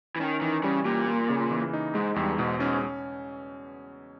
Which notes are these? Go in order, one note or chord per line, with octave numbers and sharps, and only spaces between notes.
E3
D#3 C#4
D#3 E3
C#3 G3
A#2 G4
A#3
C#3
E3
D#4
G#2 G#3
E2 G2
G#2 B2
G#2 C#4
C#4